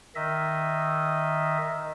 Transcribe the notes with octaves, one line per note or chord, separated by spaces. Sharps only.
D#3 D#5 E5